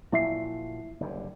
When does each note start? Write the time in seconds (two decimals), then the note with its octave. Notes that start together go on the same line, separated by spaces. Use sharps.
0.12 A#2 F3 F#3 E4 E5 C7
1.00 F#1 G2 D3